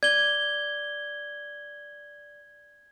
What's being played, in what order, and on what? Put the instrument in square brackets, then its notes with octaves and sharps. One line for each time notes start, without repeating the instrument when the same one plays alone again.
[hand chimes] D5 [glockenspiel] G#6 G7